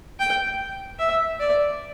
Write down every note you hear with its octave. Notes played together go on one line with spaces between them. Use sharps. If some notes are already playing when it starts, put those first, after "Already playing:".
G5
E5
D5